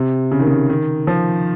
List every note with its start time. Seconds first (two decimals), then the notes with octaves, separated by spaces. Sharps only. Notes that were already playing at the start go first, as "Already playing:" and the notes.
Already playing: C3
0.31 C#3
0.39 D#3
0.47 C#3
0.70 D#3
1.07 F3